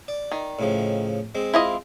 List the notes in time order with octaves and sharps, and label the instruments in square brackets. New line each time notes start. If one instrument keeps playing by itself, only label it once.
[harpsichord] D5
[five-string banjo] D#3
[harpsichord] A2 C#3 F3
G#3 C4
[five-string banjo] E4 F4 D#5